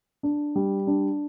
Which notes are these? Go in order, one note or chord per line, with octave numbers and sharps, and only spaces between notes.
D4
G3
D4